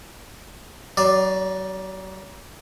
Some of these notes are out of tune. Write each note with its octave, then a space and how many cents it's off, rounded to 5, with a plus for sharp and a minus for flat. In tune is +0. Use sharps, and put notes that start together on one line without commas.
F#3 +35 D5 +0